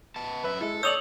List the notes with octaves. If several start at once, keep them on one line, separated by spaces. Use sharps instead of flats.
B3 A5
F#2 B4 E5
G#3 E4 A4
C#5 D5 D#6 E6 G6 F7 F#7